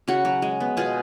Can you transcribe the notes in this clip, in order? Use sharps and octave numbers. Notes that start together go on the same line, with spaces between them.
C#3 F#4
F#3
G#3
B3
B2 F4 G#4